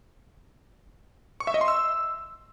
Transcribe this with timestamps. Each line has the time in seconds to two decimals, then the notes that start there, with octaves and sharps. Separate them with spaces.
1.40 C#6
1.47 E5
1.54 D#5
1.61 C6
1.68 E6